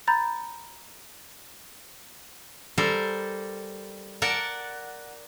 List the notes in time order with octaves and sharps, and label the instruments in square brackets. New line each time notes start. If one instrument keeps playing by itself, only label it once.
[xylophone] A#5 B5 G6 A6
[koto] G3 A4 A#4 C5
A#4 D5 F#5 A5